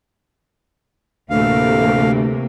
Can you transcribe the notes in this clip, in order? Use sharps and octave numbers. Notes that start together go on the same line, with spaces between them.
D2 A2 C3 E3 A3 A#3 F5